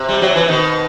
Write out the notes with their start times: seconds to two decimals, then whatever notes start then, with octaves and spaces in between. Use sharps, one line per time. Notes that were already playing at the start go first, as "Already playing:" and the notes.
Already playing: C3
0.08 G3
0.21 F#3
0.35 E3
0.48 B2 D#3